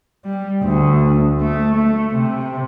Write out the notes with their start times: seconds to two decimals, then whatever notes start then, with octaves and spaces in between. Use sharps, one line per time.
0.25 G3
0.63 D2
1.40 A3
1.75 A3
2.15 C3